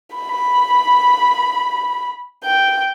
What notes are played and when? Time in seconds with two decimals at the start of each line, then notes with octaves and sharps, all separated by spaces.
0.16 B5
2.44 G5